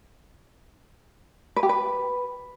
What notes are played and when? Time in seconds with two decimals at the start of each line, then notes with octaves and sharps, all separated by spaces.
1.56 B4
1.63 G4
1.69 B4